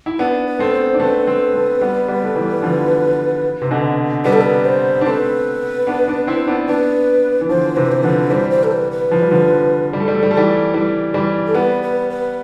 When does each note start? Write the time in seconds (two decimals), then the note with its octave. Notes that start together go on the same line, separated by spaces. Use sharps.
0.06 E4
0.19 B3 D4 B4
0.47 B4
0.59 A3 C4
0.73 C5
0.94 D4
1.00 A3 C4 B4
1.27 A3 C4
1.54 A3 C4
1.81 G3 B3
2.08 G3 B3
2.24 A3
2.36 E3 G3
2.62 D3 F3
3.62 C3
3.71 B2 D3
4.25 G3 B3 B4
4.33 A4
4.41 B4
4.65 C5
5.01 D4
5.06 A3 C4 B4
5.87 B3 D4
6.08 B3 D4
6.27 C4 E4
6.47 B3 D4
6.68 B3 D4 B4
7.41 E3
7.49 D3 F3 C5
7.76 C3 E3 B4
7.92 C5
8.03 D3 F3 B4
8.30 E3 G3 C5
8.51 C5
8.64 A4
8.71 B4
8.91 B4
9.11 F3
9.22 G3
9.31 D3 F3
9.93 G3
10.00 A3
10.08 G3
10.15 A3
10.23 G3
10.31 A3
10.37 E3 G3
10.74 E3 G3
11.14 E3 G3
11.47 A4
11.55 G3 B3 B4
11.82 B4
12.10 B4